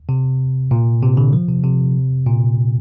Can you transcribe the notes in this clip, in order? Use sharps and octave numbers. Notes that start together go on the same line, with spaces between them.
C3
A#2
C3
D3
F3
C3
C3
A#2